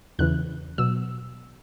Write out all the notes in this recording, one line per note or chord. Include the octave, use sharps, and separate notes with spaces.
E2 C#3 E3 F#6
B2 F#3 E6